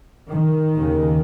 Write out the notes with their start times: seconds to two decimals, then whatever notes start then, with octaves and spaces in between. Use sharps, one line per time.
0.30 D#3
0.75 D#2 C#3